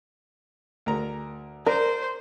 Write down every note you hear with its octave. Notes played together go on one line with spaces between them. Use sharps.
D2 A#4 A#5
A#4 C5 D5